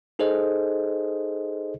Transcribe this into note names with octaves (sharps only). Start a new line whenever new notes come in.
D#4 G#4 A4 C5 D#5